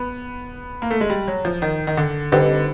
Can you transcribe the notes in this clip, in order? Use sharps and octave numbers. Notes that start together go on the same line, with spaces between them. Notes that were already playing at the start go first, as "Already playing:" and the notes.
Already playing: B3
A#3
A3
G#3
G3
F#3
F3
D#3
D#3
D3
D3 G3 C4 D#4 G4 B4